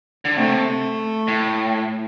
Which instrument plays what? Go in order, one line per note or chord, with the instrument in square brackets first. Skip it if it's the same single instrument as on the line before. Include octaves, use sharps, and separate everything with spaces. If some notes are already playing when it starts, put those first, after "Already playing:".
[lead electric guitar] D3
[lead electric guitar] C3 [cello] A3
[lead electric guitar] A2